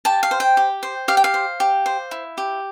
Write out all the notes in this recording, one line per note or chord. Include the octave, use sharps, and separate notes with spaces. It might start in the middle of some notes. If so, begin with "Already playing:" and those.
G4 A5
F5
C5
G5
G4
C5
G4 F5
G5
F5
C5
G4
C5
E4
G4